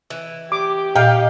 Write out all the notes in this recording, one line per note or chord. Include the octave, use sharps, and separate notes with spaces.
E3
G4 D6
A#2 D#4 F5 G5